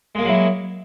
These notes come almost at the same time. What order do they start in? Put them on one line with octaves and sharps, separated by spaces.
G#3 A#3 G#4 F#3 E4